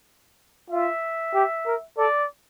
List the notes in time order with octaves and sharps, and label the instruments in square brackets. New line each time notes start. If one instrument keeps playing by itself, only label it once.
[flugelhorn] F4 [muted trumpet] E5
[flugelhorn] G4
A#4
[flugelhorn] A4 [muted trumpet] D5